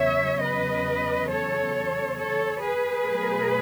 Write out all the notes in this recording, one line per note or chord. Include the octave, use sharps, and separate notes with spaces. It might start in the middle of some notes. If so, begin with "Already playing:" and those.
Already playing: E2 C#3 F#3 C#5 E5
B4 D#5
A4 C#5
A4 C#5
G#4 B4
B2 F#3 A3